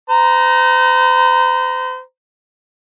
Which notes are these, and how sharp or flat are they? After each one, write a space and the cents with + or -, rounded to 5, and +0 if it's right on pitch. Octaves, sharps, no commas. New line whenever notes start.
C5 -40 A#5 +5